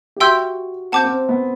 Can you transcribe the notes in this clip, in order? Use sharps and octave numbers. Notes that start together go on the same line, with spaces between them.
G4
F#4 E5 G5 C6 E6 G6
C4 F#5 A5 D6 G6
C4
B3